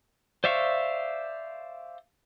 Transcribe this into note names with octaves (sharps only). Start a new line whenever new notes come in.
C5 D5 E5 F5 C#6